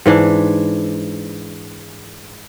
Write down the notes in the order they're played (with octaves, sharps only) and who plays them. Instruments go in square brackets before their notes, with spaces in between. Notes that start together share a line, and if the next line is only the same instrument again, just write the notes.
[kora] G#2 E3 D4